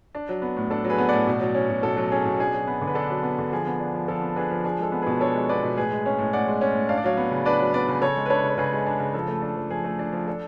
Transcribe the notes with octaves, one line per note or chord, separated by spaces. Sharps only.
D4
F#3
B3
A2
D4 A4
F#3
G#4 B4
B3
A2 D5 F#5
B2
F#3
C#4
B2
B2 A4
F#3
C#4 G#4
B2
D4 G#4
F#3
B3
D3
B4
D4 A4
F#3
B3
D3
F3 G#4
B3
D4
F3
F3 A4
B3
D4 G#4 B4
F3
D4 G#4
G#3 A4
B3
B2 G#4 B4
D4 A4 C#5
G#3
B3 B4 D5
B2
A2 G#4 B4
G#3
C#4
A2
A2 D5 F#5
G#3
C#4
A2
D4 F5
D5
F#3 C#5 F5
B3
C#3
D4 B4 D5
F#3
B3 B4 D5
C#3
C#3 A4 C#5
G#3
B4
D4 A4 C#5
C#3
C#5
C#3 G#4 B4
G#3
D4
C#3
F3 A4
A3
D4
F3
F3 G#4
A3
D4
F3
D4 A4